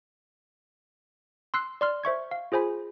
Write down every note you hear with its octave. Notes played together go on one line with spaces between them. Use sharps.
C6 E6 F#6 C7
D5 C6 F6
C5 E5 C#6 G#6
F5
F4 G#4 C5 G#5 B5